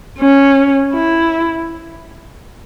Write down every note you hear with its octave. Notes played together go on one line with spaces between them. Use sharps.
C#4
E4